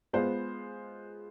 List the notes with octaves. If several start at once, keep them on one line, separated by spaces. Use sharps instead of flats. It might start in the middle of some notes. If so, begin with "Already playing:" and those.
G#3 B3 F4 C5